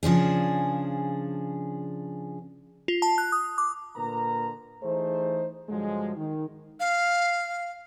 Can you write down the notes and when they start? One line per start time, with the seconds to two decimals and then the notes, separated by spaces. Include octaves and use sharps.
0.03 C#3 F3 D4 G#4
2.88 F4
3.02 A5
3.18 F#6
3.32 D#6
3.58 D6
3.96 A#2 D3 A#4 B4 A#5
4.83 E3 A3 D#4 G#4 C5
5.69 G2 D3 F3 F#3 G#3
6.16 D#3
6.80 F5